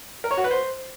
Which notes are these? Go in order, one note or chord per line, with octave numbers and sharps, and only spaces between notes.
A#4
C#5
F#4
B4
C5